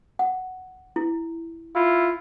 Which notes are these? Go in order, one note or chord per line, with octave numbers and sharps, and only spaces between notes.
F#5
E4
E4 F4